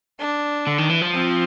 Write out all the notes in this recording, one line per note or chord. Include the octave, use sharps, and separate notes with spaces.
D4
D3
D#3
E3
F3
C4